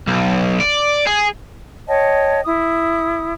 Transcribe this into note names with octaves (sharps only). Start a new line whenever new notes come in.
B1
D5
G#4
C#5 D#5 G5 A5
E4 D#6